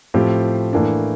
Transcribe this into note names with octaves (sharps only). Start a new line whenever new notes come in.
A2 F3 C4 G4
A2 E3 A#3 D4